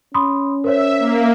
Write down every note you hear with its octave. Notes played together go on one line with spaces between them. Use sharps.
C#4 B5 C6 D#6
A#4 C5 C#5 E5
A#3